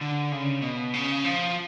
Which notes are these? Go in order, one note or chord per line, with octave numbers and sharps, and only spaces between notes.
D3
C#3
B2
C#3
F3